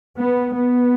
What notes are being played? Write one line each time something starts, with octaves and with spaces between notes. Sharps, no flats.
B3
B3